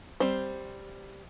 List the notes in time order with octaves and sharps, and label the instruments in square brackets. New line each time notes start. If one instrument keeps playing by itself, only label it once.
[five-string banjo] G3 C4 C5